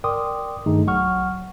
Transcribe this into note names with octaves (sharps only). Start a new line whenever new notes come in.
A#4 D5 G5 C6 D6 D#6
G2 D#3 A3 D#4 G#4
A#1 F#3 F#5 C#6 F6